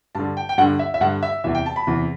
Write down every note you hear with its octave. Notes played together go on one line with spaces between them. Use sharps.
G2 D3 A5
G5
G5
G2 D3 F#5
E5
E5
G2 D3 F#5
E5
E2 C3 E3 E5
G5
A5
B5
E2 C3 E3